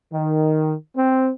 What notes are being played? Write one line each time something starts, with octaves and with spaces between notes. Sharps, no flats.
D#3
C4